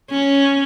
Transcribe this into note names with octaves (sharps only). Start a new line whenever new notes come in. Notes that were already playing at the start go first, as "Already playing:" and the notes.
C#4